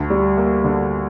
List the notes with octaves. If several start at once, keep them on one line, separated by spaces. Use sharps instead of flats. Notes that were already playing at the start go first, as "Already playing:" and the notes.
Already playing: D2
G3
A#3
D3